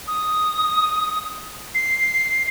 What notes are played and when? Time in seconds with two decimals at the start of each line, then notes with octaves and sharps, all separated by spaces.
0.07 D#6
1.75 C7